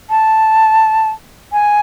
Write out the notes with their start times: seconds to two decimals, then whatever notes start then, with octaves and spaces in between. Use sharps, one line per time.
0.10 A5
1.53 G#5